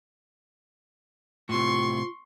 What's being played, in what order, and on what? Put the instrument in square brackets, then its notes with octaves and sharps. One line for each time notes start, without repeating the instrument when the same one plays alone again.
[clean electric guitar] A2 C3 [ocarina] F4 [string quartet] C6 [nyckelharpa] C#6